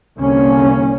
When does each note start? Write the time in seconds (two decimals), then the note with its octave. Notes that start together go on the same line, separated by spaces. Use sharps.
0.19 C2 D3 A#3 C#4